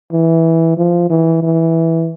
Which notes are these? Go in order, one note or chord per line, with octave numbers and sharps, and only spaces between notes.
E3
F3
E3
E3